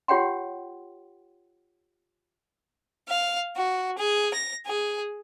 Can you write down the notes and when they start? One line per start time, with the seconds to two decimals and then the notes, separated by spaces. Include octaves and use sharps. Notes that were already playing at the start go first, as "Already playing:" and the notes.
0.08 F4 G4 C#5 F#5 G5 C6
3.09 F5
3.57 F#4
3.98 G#4
4.34 A#6
4.66 G#4